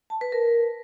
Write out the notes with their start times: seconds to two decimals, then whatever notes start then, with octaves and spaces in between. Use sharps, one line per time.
0.10 A5
0.21 B4
0.32 A#4